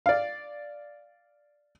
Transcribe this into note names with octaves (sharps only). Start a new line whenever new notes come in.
D5 F5